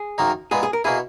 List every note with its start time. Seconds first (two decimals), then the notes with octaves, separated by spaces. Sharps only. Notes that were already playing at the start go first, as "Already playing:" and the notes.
Already playing: G#4
0.18 F#2 D#3 A#3 D#4
0.51 A#2 G#3 B3 G#4
0.63 G#4
0.73 A#4
0.84 B2 A#3 E4 G#4